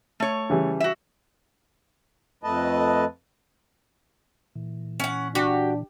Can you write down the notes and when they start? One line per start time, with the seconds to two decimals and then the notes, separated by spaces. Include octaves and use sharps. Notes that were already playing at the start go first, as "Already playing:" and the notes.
0.20 A3 C#5
0.50 C#3 E3 G3
0.80 F#4 E5
2.44 F2 A3 B4 D#5 A5
4.55 A#2 E3
5.00 C#4 F#5
5.35 D4 F#4 G4